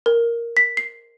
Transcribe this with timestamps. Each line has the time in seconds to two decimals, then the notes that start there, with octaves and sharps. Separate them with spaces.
0.06 A#4
0.57 B6
0.77 C7